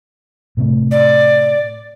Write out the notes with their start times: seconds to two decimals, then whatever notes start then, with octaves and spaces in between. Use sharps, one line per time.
0.57 A2 C3 A3
0.91 D5